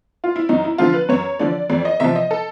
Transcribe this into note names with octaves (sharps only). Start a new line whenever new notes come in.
F4
E4
F#2 D#4
E4
D3 F3 F4
B4
F#2 C#5
D3 F3 D5
F2 D5
D#5
C3 F3 E5
D#5
A4